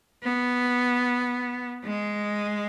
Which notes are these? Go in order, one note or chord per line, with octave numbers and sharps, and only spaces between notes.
B3
G#3